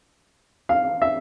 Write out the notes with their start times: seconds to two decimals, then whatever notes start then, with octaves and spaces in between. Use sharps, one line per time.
0.69 F5
1.02 E5